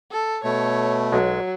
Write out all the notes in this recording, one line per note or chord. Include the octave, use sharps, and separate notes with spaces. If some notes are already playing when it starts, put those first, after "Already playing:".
A4
B2 A3 C#5
B1 F#3 G#3